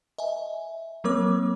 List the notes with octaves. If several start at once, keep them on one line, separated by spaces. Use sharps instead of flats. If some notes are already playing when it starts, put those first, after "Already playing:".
D#5 E5 G#5
F#3 A#3 C4 A#4 C#5 D6